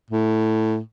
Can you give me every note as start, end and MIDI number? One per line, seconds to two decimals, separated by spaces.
0.10 0.79 45